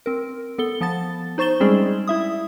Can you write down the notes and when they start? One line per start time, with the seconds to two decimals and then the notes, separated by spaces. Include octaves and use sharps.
0.06 C4 A#4
0.58 B3 A4 G7
0.81 F3 B3 A5 A6
1.38 D#4 C5 C#6 A6 E7 G7
1.60 G3 G#3 C4 C#4 G#4 D5
2.07 E4 E5 D#6